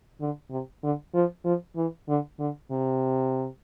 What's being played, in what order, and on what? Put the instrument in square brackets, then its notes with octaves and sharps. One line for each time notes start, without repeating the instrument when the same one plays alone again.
[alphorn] D3
C3
D3
F3
F3
E3
D3
D3
C3